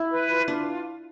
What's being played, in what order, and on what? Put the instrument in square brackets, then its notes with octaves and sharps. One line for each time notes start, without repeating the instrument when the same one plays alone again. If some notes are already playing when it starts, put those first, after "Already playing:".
Already playing: [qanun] E4
[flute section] B4
F4
[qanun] D4 [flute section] F4